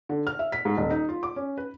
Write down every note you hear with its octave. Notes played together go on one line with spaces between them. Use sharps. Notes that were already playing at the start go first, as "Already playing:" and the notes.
D3
F6
E5
B6
G#2
D#1
D#4
F4
D6
C#4
B4